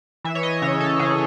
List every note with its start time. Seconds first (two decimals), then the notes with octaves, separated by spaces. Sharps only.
0.24 E3 E5
0.35 C#5
0.43 D#5
0.62 C#3 C#5
0.80 A4
0.99 C#3 G#4